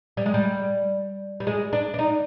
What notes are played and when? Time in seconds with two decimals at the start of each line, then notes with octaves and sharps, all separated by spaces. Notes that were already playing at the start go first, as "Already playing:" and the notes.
0.17 G3
0.26 G#3
0.34 G3
1.40 G3
1.47 G#3
1.73 D4
1.94 D4
1.99 D#4